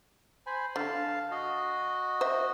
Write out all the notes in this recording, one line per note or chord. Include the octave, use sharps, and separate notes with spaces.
C5 G#5 B5
D3 F5 A5
F#4 D#5
C5 E5